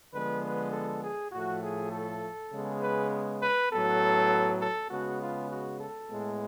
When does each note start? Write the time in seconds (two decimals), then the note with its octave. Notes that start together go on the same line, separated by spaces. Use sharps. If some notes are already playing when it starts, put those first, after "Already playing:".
0.14 D3 F3 G#3 B3 B4
0.43 B4
0.72 A4
1.03 G#4
1.32 A2 F3 A3 F#4
1.62 G#4
1.92 A4
2.52 C#3 G#3 B3
2.81 B4
3.42 B4
3.71 A2 F#3 B3 A4
4.61 A4
4.90 C#3 G#3 B3 F#4
5.21 F4
5.50 F#4
5.80 A4
6.09 A2 G#3 B3